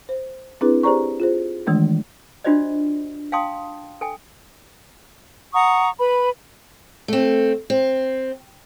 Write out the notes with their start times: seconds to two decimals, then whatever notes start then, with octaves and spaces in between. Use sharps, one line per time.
0.09 C5
0.61 C4 D4 E4 G#4 B4
0.83 G4 G#4 C5 D5 A#5 C#6
1.20 F4 G#4 C5
1.67 D#3 E3 G#3 A3 D4
2.44 D4 F4 F#4 C5 D5 D#5
3.32 F5 G5 A5 C6 D#6
4.01 A4 G5 G#5
5.53 F#5 A#5 C#6 D#6
5.99 B4 B5
7.08 A3 C4
7.70 C4